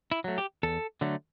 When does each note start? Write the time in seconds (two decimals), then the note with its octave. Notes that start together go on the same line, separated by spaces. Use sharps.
0.12 E4
0.24 F#3 A3
0.38 G4
0.63 E2 A4
1.01 D3 F#3 A3